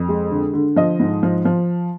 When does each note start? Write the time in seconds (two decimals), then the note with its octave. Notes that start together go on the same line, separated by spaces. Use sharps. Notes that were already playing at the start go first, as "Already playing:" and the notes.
Already playing: F2
0.09 G#3
0.31 D3
0.53 D3
0.76 F3 D#5
0.99 G#2
1.23 F3
1.45 F3